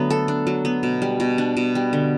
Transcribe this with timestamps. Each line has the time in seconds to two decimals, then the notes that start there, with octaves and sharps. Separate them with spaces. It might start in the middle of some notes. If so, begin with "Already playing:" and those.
Already playing: D3 F#3 A3 B3
0.10 A4
0.28 D4
0.47 F#3
0.65 B3
0.83 B2
1.02 G3
1.20 B2
1.38 D4
1.57 B2
1.75 G3
1.93 D3